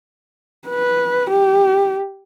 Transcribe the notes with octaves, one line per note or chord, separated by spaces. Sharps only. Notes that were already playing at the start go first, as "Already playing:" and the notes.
B4
G4